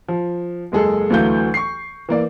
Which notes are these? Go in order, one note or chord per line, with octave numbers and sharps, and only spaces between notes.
F3
F#1 G#3 G#4 A4
D2 E3 F#3 A3 F5 G6
C#6 C7
E3 A#3 D5